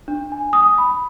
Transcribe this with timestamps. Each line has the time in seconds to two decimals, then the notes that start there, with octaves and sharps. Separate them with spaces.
0.08 D4
0.32 G#5
0.53 D#6
0.78 B5